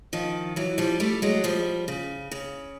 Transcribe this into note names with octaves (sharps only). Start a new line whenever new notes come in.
D#3 F3
E3 F#3
F3 G3
G3 A3
F#3 G#3
F3 G3
C#3
C#3